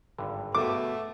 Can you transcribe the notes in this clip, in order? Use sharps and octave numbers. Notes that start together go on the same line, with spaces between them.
G#1 G2 D3
B2 A3 D6